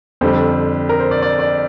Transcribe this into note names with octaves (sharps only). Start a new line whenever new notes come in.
F2 D3 G3 C5
A#4
C5
D5
D5
D5